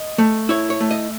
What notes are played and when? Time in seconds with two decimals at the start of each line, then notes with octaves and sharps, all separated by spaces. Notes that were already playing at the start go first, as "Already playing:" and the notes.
Already playing: D#5
0.18 A3
0.49 E4 C#5
0.70 C#5
0.80 A3
0.91 D#5